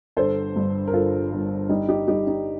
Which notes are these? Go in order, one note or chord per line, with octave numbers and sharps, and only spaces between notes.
G1 A4 C5
G2
A#4
G1 F4 A4
G1
G3 D#4
D#4 G4
G3 D#4 G4
D#4